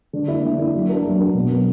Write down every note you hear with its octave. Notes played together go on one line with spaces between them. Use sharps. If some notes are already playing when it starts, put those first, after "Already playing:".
D3
A#3 E4
D3
A#3 E4
F#3
A#3 D4 A#4
F#3
A#3 D4 A#4
B2
F#3 B3 D4